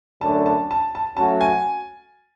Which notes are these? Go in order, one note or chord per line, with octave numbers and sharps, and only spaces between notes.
F#2 D3 A3 D4 A5
A5
A5
A5
F#3 A3 C#4 F#4 A5
G#5